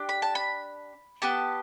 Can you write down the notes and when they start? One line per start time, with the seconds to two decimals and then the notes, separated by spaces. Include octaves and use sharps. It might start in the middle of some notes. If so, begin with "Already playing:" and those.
Already playing: D4 G4
0.09 B5
0.22 A5
0.35 B5
1.22 B3 G4 A5